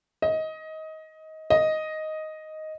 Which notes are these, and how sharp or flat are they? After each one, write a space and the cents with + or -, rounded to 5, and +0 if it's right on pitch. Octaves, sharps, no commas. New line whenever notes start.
D#5 +20
D#5 +5